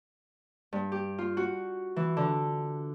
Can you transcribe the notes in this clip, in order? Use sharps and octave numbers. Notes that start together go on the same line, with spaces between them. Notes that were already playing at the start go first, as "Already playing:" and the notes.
G2
G4
F4
F#4
E3
D3